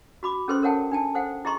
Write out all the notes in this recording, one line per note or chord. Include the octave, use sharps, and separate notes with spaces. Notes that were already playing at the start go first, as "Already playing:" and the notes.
F#4 B5 D6
C#4 G#4 A4 B4 C5 C6
A4 A#4 C#5 F#5 G5 A5
D4 G5 A5
A4 C5 F#5 G5
E4 G#4 D#5 A#5 C6 C#6